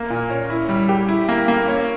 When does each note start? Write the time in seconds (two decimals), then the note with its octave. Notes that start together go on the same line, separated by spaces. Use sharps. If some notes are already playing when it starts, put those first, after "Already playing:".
Already playing: A#3
0.10 A#2
0.30 C#4
0.50 E4
0.69 G3
0.89 G4
1.08 E4
1.29 A#3
1.48 A#3
1.68 C#4